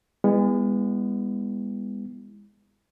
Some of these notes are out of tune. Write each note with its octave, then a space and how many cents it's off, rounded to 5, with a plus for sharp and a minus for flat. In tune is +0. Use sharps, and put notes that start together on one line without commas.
G#3 -35 B3 +0 E4 +0